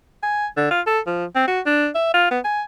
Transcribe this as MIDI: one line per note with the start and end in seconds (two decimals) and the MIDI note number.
0.23 0.46 80
0.57 0.69 50
0.71 0.81 65
0.87 1.00 69
1.07 1.25 53
1.35 1.47 60
1.47 1.60 66
1.66 1.88 62
1.95 2.11 76
2.14 2.26 65
2.31 2.39 59
2.45 2.62 80